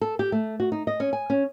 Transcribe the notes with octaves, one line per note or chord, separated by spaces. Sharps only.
A4
G4
A3
F#4
D#4
D#5
C#4
G#5
C#4